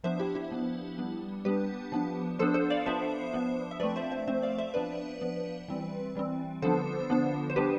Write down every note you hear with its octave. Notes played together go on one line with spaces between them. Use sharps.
F3 B3 D4 C5 E5
E4 G4
E4 G4
F3 B3 D4
G3 B3 D4
G3 B3 D4 G4 B4
F3 B3 D4
F3 B3 D4 A4 C5
A4 C5
D5 F5
F3 B3 D4 C5 E5
F3 B3 D4
E5
F3 A3 C4 B4 D5
C5 E5
C5 E5
F3 A3 C4 C5 E5
D5 F5
C5 E5
F3 B3 D4 B4 D5
F3 B3 D4
E3 G3 C4
E3 G3 C4
D3 F3 B3 D4 A4 C5
D3 F3 B3 D4
C5
G3 B3 D4 G4 B4